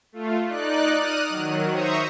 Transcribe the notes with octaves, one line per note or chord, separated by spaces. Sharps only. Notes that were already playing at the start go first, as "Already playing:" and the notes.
A3 F4
D#4 D5 F#6
D#6 F6 F#6 D#7
D#3 F#3
C5 E5 A#5 C#6 D#6